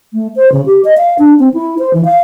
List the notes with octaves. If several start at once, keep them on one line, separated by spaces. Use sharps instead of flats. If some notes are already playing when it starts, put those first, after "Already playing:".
A3
C5
C#3
G4
D#5
F5
D4
C4
E4
C5
E3
F5